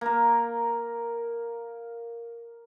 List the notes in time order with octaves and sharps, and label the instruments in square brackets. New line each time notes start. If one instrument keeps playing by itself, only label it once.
[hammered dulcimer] A#3 A#4